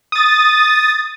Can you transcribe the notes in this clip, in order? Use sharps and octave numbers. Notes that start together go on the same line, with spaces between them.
D#6 A6